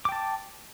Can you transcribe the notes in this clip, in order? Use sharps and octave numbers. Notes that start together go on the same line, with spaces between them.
G5 A5 D6